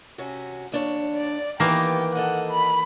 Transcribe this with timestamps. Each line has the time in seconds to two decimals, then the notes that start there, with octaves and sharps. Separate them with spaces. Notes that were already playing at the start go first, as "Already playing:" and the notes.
0.18 C3 C#4 F#4
0.72 D#2 D4 C#5
1.17 D5
1.60 D#3 E3 A#3 B3 G4 G5
2.15 A4 D#5 F#5 G#5
2.51 B5